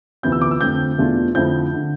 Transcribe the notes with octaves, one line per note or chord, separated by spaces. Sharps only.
D2 C3 E3 B3 F4 G6
E6
D6
E6
F2 D3 A3 C4 G6
E2 B2 A3 D4 F4
F2 D3 F3 A3 E4 G6
D3